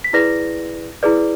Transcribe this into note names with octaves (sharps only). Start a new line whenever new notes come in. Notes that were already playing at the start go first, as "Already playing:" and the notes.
B6
E4 G#4 B4 D5 A#6
E4 G#4 B4 D5